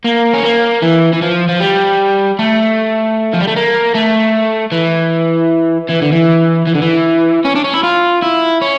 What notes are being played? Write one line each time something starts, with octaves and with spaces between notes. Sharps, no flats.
A#3
C#4
A#3
E3
E3
F3
F3
G3
A3
F3
G3
A3
A#3
A3
E3
E3
D3
E3
E3
D3
E3
C#4
D4
C#4
E4
F4
E4
C#4